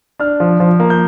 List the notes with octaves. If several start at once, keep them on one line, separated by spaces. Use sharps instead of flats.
D4 F6
F3
F3
A#3
G6